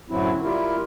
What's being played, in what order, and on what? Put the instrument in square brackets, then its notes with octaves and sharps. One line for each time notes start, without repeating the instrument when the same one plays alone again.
[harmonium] F#2 A2 D3 F#3 C4 E4
G3 E4 F4 G4 A#4